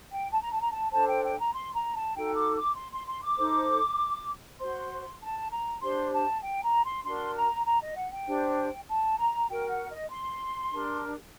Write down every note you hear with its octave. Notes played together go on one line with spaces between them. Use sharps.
G5
A5
A#5
A5
A#5
A5
D4 A4 C5 A5
G5
G5
A#5
C6
A#5
A5
D#4 F#4 A4 G5
D6
D6
C6
C6
C6
D6
D#4 A4 C5
F#4 C5 C6
A5
A#5
D4 G4 C5 C6
A5
G5
A#5
C6
D4 F#4 A#4 C6
A#5
A#5
D#5
F#5
G5
D4 G4 C5
A5
A#5
F#4 A#4 G5
F#5
D#5
C6
D4 G4 A#4